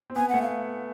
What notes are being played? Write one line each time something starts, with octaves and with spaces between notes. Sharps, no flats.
C4
B3 G#5
A3 F#5
F5